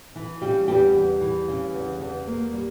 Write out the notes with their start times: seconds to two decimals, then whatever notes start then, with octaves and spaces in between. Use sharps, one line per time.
0.15 E3
0.41 C#3 G3 G4
0.68 E2 G3 G4
0.95 E2
1.21 E3
1.48 C#3
1.75 E2
2.01 E2
2.27 A#3
2.53 G3